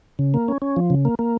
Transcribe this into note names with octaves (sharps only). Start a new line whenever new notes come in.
C#3
A#3
C#4
C#4
F3
C#3
A#3
A#3